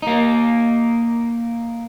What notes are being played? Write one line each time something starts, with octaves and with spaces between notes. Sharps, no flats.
A#3 D#4